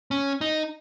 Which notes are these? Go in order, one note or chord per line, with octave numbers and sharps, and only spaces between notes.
C#4
D#4